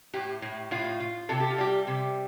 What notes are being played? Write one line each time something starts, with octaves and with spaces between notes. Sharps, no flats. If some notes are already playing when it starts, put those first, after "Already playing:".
A2 G4
A2
A2 F4
F4
C3 A4
G4
F4
G3 G4
C3